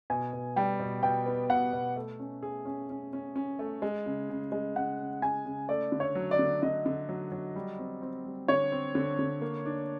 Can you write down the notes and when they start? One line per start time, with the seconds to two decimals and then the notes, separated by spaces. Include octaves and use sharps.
0.10 B2 G#5
0.33 B2
0.56 G3 G5
0.80 B2
1.03 B2 G5
1.26 B3
1.50 B2 F#5
1.73 B2
1.96 A3
2.20 C#4
2.43 G#4
2.65 C#4
2.90 C#4
3.13 C#4
3.36 C#4
3.59 A3
3.82 G#3
4.06 C#3
4.29 C#3
4.52 G#3
4.75 C#3 F#5
4.99 C#3
5.22 C#3 G#5
5.45 C#3
5.69 A3 D5
5.92 D3
6.00 C#5
6.15 F#3
6.31 D5
6.39 D3
6.62 D3 D#5
6.86 D3
7.09 F#3
7.32 F#3
7.56 G3
7.79 C4
8.02 C4
8.25 G3
8.48 D3 C#5
8.72 C4
8.95 D3
9.19 D3
9.41 A#3
9.66 D4